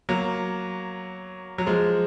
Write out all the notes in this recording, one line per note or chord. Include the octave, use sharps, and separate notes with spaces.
F#3 A#3
F#3
F3 G#3